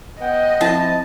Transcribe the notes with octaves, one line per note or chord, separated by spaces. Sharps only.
B3 D#5 F#5 G5
F3 C4 E4 E5 A5